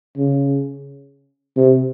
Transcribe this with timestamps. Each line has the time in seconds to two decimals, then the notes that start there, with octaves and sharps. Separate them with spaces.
0.17 C#3
1.57 C3